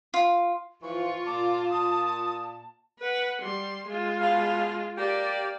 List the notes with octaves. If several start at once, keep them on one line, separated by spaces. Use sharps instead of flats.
F4
E3 F3 F4 C#6
A#2 A5 D6
D#6
B4 F#5
G3 C6
G#3 F4
B2 F5
A#3 G4 D5